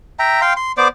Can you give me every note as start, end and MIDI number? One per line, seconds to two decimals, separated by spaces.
0.19 0.41 76
0.19 0.41 79
0.19 0.41 82
0.41 0.53 77
0.41 0.53 79
0.41 0.53 84
0.57 0.72 84
0.77 0.88 59
0.77 0.88 72
0.77 0.88 74
0.77 0.88 86